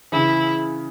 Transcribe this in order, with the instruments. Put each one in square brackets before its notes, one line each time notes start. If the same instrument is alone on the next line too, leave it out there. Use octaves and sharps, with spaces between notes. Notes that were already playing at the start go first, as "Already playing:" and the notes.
[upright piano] C#3 E3 [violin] E4